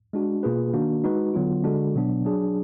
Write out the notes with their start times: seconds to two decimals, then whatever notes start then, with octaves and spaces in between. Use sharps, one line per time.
0.13 G#3 D4 F#4
0.43 B2 A#3 F4 G#4 B4
0.73 D#3 A#3 D4 F#4
1.04 G#3 D#4 F#4 B4
1.34 D3 F#3 B3 F4
1.64 D3 G#3 D4 F#4
1.95 B2 F#3 B3 D4
2.25 F#3 D4 G#4